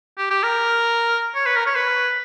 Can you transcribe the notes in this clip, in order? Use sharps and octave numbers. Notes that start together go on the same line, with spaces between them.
G4
G4
A#4
C#5
B4
A#4
C#5
B4